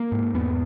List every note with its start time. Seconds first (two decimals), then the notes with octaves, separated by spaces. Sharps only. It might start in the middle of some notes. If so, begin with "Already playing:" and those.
Already playing: A#3
0.12 G#2
0.34 E2 B3